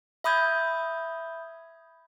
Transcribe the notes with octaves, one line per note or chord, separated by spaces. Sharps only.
E5 B5 D#6 G6 G#6